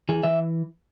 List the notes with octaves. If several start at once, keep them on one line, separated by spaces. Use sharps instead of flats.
E3 G#4
E3 E5